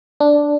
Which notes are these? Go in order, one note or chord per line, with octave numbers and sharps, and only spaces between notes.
D4